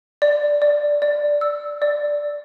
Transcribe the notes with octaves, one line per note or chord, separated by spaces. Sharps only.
D5
D5
D5
E6
D5